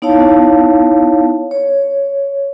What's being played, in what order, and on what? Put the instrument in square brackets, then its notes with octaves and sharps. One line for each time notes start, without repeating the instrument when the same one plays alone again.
[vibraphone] B3 D#4 E4 C#5 F5 A5
C#5